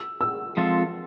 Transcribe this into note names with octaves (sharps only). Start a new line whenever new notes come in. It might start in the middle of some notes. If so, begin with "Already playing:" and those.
Already playing: E6
E6
F3 G#3 C4 F4 A4